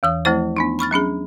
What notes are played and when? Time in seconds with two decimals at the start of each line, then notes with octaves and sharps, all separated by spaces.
0.03 E2 E3 D#6
0.25 F3 A3 C4 E4 C5
0.57 B3 D4 D#4
0.79 B5 C#6 F6 A6
0.91 F#3 C#4 D4 G#4